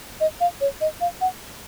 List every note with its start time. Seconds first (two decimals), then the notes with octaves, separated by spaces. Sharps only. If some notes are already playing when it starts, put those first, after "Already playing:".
0.21 D#5
0.41 F5
0.61 C#5
0.81 D#5
1.01 F5
1.21 F#5